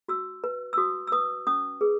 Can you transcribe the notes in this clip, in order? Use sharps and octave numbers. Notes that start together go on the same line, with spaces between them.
F#4 E6
B4
E6
F#4 D#6
E6
B4 D#6
C#4 D#6
G#4 B4